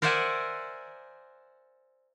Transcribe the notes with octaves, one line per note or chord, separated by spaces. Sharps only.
A#4 C5 D5 E5 F#5 G#5